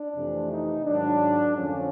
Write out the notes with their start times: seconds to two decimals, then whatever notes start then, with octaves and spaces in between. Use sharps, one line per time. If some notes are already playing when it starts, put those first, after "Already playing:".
Already playing: D4
0.16 F2 C3 E3 A3
0.52 D#4
0.86 G#2 D#3 F#3 D4
1.56 F2 D3 F3 C#4